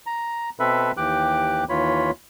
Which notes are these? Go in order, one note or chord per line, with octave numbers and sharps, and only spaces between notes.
A#5
B2 C4 A4 B4 E5 B5
D#2 E3 G4 G5 D6 F#6
D#2 E3 F4 C#5 B5